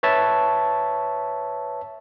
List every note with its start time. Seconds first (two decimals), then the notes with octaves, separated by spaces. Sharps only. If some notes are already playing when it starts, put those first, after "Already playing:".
0.03 B4 C#5 E5 A5